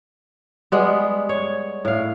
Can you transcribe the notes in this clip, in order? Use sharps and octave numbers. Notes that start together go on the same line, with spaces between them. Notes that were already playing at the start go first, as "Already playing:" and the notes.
G3 G#3 B3
C#5
A2 F5